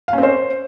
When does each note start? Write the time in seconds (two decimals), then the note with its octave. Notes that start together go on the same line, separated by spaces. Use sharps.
0.08 F5
0.13 C#4
0.18 C4
0.23 C5